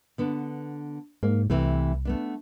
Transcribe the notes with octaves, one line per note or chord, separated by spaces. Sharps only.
D3 B3 D4
G#2 A#3
C2 C3 E3 A3
A3 B3 D4